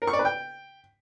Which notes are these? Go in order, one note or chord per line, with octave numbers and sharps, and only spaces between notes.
A#4
C#6
D5
B4
G5